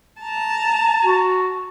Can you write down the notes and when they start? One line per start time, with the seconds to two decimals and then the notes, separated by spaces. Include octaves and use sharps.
0.22 A5 A#5
1.05 F#4